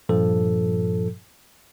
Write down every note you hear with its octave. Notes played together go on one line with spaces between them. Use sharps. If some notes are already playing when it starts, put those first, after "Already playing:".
G2 A#2 F3 A4